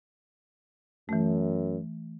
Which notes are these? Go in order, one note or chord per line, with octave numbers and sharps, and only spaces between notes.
F#2 E3 A3